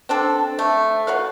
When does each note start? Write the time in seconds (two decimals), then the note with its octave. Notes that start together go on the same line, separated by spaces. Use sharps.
0.09 C4 D4 A4
0.59 A3
1.07 F#4 B4 C#5 F5